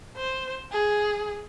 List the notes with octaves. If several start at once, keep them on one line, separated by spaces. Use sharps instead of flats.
C5
G#4